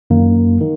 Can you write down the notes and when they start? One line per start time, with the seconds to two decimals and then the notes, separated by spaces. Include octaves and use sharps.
0.10 F#2 D#3 A#3
0.61 D#3